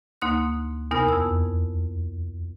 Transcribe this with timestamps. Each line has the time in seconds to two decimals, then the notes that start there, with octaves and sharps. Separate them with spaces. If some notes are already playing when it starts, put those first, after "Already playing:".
0.22 D2 A#3 D#4 C6 F#6
0.91 E2 C3 B3 D#4 A#4 F6
1.08 F2 E6